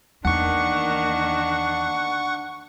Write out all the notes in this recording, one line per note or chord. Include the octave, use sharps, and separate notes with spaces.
E2 D#3 A#3 D4 F#5 C#6